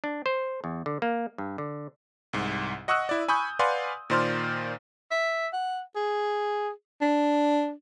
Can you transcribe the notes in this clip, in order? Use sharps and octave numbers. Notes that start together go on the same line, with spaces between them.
D4
C5
E2
D3
A#3
G2
D3
C2 G#2
D#5 F#5 C#6 D#6 E6 F#6
E4 D5
G#5 B5 C#6 D#6 G6
B4 D5 F5 F#5 G#5 C6
A#2 D#3 C5 D5 C6 F6
E5
F#5
G#4
D4